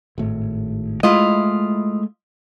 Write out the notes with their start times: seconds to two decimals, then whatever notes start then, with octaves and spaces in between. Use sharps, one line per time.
0.18 G#1 A2
1.03 G#3 A3 E4 F4 D#5